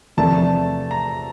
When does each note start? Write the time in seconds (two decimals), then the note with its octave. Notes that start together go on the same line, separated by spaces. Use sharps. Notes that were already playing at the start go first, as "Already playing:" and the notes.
0.17 E2 C3 F3 A3 D4 A5
0.91 A#5